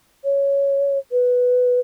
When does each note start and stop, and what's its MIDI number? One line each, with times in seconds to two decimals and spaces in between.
0.24 0.98 73
1.12 1.80 71